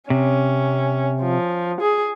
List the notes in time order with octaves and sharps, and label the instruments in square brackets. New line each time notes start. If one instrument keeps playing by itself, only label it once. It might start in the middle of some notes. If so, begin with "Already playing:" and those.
[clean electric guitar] C3 [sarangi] C#4
[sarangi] F3
G#4